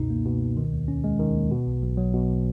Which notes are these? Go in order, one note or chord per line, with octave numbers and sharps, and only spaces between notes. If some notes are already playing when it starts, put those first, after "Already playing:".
Already playing: C#2 F#2 B2 D#4
A#3
B2
C#2
D#3
D#2
C#4
G#3
D#3
D#2
B2
B1
B1
F#3
B2